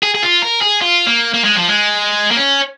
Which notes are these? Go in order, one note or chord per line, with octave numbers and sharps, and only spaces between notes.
G#4
G#4
F4
A#4
G#4
F4
A#3
A#3
G#3
F3
G#3
A#3
C#4